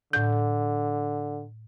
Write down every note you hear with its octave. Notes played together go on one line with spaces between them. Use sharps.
A2 D3 G6